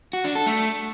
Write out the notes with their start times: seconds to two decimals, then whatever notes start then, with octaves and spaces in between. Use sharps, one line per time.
0.13 F#4
0.24 D4
0.35 A4
0.46 A3